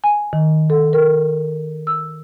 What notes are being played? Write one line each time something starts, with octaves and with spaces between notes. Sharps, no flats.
G#5
D#3
A4
A#4
E6